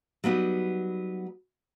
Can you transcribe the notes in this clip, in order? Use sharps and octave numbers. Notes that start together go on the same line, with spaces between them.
F#3 G3 B3 D#4